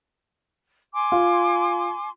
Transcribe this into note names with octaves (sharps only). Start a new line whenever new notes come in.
G#5 C6 D6
F4